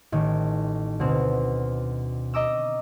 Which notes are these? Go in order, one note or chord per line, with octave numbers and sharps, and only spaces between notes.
A1 D#3
D2 B2 C4
D#5 A#5 D6 E6